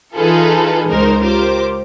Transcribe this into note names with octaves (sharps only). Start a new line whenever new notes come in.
E3 D#4 F4 G#4 A4 B4
C#2 G#3 D#4 A#4 C5
F4 G4 A#4 C5 D6